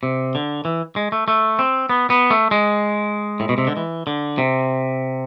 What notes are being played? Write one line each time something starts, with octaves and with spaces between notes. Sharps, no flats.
C3
D3
E3
G#3
A3
A3
C4
B3
B3
A3
G#3
A2
B2
C3
D3
E3
D3
C3